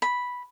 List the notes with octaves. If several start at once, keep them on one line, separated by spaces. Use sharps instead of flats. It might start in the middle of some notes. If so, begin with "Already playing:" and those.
B5